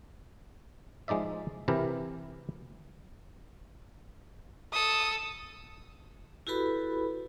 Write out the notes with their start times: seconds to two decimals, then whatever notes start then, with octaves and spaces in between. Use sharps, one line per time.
1.08 F3 G#3 D#4 D5 E5
1.68 C3 E3 E4 G4 A#4
4.73 A4 D#6
6.47 E4 F#4 G4 A4 B4 B5